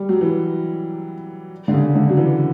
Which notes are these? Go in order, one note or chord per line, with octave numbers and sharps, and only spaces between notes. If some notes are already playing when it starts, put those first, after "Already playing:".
Already playing: G3
F#3
E3
D3
C#3
D3
F#3
E3